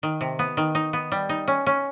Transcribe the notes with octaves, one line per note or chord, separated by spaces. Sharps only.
D#3
C3
B3
D#3
D#4
B3
G3
D#4
C#4
C#4